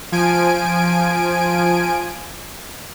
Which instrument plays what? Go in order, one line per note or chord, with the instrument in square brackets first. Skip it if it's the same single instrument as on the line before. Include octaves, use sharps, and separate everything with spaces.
[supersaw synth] F3 G#5 D7